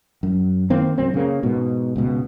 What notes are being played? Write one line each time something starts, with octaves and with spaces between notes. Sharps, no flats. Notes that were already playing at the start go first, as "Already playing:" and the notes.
F#2
D#3 A#3 C4
C2 F#2 C4
C#3 A#3
G#2 B2
C#2 B2